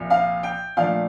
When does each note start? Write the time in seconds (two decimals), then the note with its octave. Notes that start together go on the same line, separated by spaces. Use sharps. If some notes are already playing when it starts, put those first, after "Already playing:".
Already playing: C2 A#2 F3
0.10 F5
0.43 G5
0.77 A#2 F3 A3 D4 F5